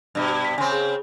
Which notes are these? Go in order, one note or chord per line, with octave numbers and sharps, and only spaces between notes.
G2 B2
B6
C#3 C4 G#5 C6
G#4